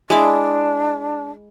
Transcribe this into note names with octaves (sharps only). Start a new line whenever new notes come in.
G#3 D4 E4 D6